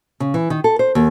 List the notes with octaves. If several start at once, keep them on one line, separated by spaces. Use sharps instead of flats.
C#3
E3
D#3
A4
C5
D#2